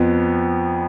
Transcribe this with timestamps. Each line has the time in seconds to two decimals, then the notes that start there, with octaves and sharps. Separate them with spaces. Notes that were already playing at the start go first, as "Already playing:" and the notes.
Already playing: F2 F3 B3